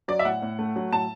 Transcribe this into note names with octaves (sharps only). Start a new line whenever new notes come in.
F#3 D5
E5
A2 F#5
A2
A3
F#3
A2 A5